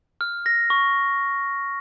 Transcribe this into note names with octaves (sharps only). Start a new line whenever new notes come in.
F6
A#6
C#6